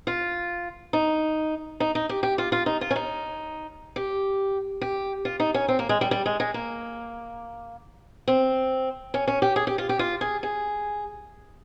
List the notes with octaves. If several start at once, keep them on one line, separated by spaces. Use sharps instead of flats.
F4
D#4
D#4
D#4
G4
G4
F4
F4
D#4
F4
C#4
D#4
G4
G4
F4
D#4
C#4
C4
A#3
G#3
G3
G3
G#3
G#3
A#3
C4
C#4
C#4
G4
G#4
G4
F4
G4
F4
G#4
G#4